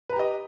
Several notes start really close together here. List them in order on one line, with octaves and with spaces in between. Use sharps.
B4 A#5 G4 D#5